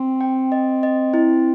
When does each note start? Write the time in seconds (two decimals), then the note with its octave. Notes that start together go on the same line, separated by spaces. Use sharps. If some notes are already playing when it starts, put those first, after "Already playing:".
Already playing: C4
0.21 G5
0.52 D#5
0.83 D#5
1.14 E4